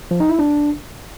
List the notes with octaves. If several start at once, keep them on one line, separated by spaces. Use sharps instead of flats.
F3
D#4
E4
D4